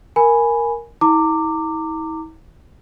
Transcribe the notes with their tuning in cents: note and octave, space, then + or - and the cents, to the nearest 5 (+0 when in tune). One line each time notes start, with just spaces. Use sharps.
A#4 +0 G#5 +0 B5 +0
E4 -45 A#5 -30 D6 +0